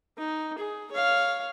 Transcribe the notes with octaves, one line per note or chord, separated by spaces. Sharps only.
D#4
G#4
C#5 F5